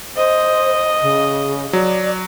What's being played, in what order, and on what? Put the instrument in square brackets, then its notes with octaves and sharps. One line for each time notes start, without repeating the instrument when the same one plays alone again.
[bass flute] C5 [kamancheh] D#5
[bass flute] C#3
[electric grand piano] F#3 [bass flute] D5